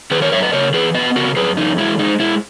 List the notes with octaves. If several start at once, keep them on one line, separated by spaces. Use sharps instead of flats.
D#3 G#4 B4
A#4 C#5
F#2 C#5 E5
B4 D#5
C#3 A#4 C#5
E3 G#4 B4
B3 B4 D#5
C#3 F#4 A#4
F#2 G#4 B4
E3 D#4
G#3 E4
G#3 D#4
G#3 E4